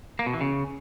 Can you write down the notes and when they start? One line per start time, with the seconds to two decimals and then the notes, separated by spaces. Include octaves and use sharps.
0.19 A#3
0.26 B2
0.34 E3
0.41 C#3